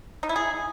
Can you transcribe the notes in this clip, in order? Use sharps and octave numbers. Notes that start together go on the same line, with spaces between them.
D#4
E4
G#4